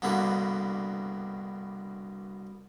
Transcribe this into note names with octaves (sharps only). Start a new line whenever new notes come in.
C2 G2 B2 D3 A#3 D#6